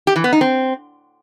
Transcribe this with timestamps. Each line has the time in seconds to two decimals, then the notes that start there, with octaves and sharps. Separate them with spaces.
0.07 G4
0.16 E3
0.24 B3
0.33 D#4
0.41 C4